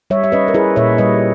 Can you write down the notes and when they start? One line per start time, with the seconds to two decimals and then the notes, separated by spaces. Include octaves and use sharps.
0.10 G3 C#5 E5
0.24 E5
0.32 C#4 B4 D#5
0.48 A#4
0.54 E4 G#4 B4
0.76 A#2 C#5 E5
0.98 G3 B4 D#5